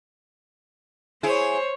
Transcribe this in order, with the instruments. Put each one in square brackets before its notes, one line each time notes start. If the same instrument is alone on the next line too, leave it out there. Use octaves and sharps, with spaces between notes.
[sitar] E4 G#4 [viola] C5 C#5